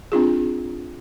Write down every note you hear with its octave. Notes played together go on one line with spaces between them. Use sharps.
C4 D4 F4 G#4